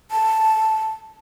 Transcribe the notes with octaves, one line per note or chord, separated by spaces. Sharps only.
A5